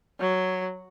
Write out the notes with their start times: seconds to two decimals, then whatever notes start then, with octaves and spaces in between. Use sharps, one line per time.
0.20 F#3